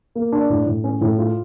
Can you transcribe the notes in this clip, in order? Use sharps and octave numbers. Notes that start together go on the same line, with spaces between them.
A#3
D4
A2
A2
C#4
A2
F4